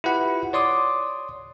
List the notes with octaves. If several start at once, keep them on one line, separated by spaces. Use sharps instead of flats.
E4 F4 G4 B4 F#5 B5
C#5 D5 C6 D6 D#6